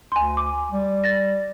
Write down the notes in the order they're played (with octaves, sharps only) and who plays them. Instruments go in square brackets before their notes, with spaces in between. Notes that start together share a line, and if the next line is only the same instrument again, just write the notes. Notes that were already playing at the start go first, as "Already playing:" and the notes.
[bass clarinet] D2 [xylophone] G#5 C6
[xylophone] D6
[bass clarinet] G3
[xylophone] A6 A#6